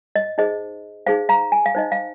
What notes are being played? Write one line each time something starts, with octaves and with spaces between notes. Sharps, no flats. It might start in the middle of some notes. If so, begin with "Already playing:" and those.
D#5
D#4 G#4 C5 D#5
D#4 G#4 C5 F5
F5 A#5
G#5
F5
D#4 C5 D#5
F5